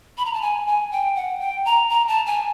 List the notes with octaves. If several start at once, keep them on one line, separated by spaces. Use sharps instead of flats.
B5
A#5
A5
G#5
G#5
G5
F#5
G5
A#5
A#5
A5
G#5